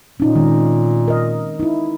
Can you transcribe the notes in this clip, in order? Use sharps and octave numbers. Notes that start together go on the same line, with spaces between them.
A#2 C#4 D#4
D#3 G#3 C4
A#4 D#5
D#4 E4